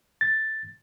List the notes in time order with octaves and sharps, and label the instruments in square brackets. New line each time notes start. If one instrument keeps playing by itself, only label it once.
[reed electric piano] A6